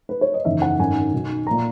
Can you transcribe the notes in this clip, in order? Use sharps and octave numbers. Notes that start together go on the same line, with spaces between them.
B4
C#5
D#5
F#1 E2 D#3 E5
F#5
G#1 F#2 D#3 G#5
B1 B2
A#2 A#5